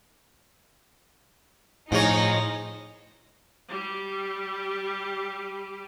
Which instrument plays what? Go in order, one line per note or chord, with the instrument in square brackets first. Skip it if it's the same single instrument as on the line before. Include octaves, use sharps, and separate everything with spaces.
[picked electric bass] A2 [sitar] F3 C#5 [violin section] D#4 G#4 D#5
[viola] G3 G4